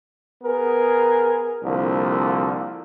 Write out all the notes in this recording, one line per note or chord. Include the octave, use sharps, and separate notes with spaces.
B3 G#4 A#4
C2 D3 F3 A#3